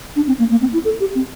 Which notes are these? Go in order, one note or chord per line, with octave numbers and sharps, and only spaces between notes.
D4
C4
A#3
A#3
C4
E4
A4
G4
C4